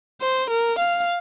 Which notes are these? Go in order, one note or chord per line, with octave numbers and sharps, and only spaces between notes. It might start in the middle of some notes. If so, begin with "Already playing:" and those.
C5
A#4
F5